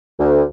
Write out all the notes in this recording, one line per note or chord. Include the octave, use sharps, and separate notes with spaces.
D2